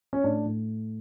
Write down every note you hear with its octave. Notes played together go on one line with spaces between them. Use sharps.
C#4
A2 D4
A2